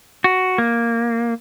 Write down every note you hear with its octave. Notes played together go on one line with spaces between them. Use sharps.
F#4
A#3